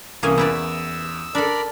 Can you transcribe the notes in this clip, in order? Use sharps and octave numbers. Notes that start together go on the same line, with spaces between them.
C2 E3 A#3 C#4 G#5 D#6
E2 E4 B4 D5 E6
D4 A4 A#4 D5 B5